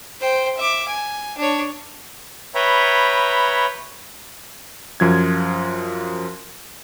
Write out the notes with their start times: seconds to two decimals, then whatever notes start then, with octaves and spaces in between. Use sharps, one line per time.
0.20 C5 G5
0.57 E5 D6
0.88 G#5
1.37 D4 C#5
2.55 B4 C#5 E5 G5 A#5 B5
5.00 F#2 F3 G#6